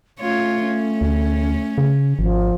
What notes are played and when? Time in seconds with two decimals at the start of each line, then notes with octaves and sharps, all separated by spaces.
0.20 A3 C#4 F4 C#5
0.65 C#4
1.01 D2
1.78 C#3
2.19 G#1 F3